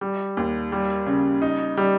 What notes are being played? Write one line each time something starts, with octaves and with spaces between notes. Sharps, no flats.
G3
D#2
G3
C#3
D#4
G3